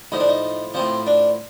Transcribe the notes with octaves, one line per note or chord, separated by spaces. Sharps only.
A2 F3 D#4
D4
D#4
A2 F3 C4
D4